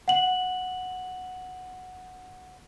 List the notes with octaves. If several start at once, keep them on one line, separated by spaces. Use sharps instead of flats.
F#5 F#7